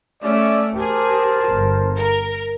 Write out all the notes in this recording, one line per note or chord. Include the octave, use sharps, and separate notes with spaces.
A3 C#4 D5 E5
G4 G#4 A#4 C5 A5
G1
A#4